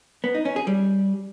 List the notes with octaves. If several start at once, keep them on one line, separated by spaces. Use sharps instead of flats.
B3
D#4
C#4
G#4
G3